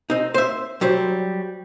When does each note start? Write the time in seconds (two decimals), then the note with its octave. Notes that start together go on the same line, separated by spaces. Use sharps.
0.10 C4 D#4
0.34 C5 E5
0.81 F#3 G3 C5